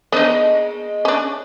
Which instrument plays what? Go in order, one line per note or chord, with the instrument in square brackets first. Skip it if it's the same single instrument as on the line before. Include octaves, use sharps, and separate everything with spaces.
[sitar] G#3 A#3 D#5 [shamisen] B3 D4 D#4
[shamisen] C#4 D4